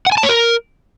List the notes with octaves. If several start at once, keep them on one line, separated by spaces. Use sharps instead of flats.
F#5
G#5
A5
C#5
A#4